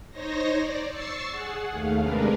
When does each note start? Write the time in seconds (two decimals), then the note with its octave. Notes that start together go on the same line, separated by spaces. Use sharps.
0.11 D#4 C5 C#5 A#6
0.57 D5
0.89 C#6 E6 A6 C7
1.31 G#4 F#5
1.70 D#2 A3 F5
2.00 C3 G#3 D4 A#4 B4